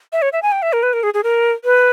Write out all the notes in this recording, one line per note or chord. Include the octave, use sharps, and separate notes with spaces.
E5
C#5
E5
G#5
G5
E5
A#4
B4
A#4
G#4
G#4
A#4
B4